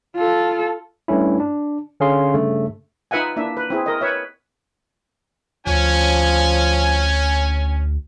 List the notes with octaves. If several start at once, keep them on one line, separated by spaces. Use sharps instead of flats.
F4 A4
G2 A3 C#4 E4
D4
D3 C#4 G#4 F5 C6
G2 C#3 A3
D#4 F4 B4 E5 F#5 G#5
A#3 D4 E4 E5
B4
C4 E4 G#4
A#4 D#5
B4 C#5 E5
D2 F3 C#4 G#5